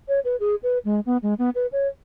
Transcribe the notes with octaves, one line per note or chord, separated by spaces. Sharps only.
C#5
B4
G#4
B4
G#3
B3
G#3
B3
B4
C#5